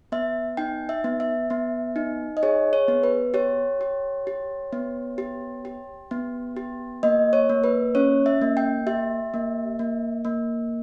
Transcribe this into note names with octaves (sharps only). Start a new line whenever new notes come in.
B3 E5
D#4 G5
E5
B3
E5
B3
D#4
D#5
G#4 C#5
C#5
B3
B4
G4 C#5
G4
G4
B3
G4
G4
B3
G4
A#3 D#5
C#5
A#3
B4
C#4 C#5
E5
A#3
G5
G4 E5
A#3
A#3
A#3